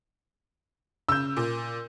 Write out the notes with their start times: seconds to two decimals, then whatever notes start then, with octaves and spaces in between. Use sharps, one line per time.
1.09 C#3 E6 G6
1.37 A#2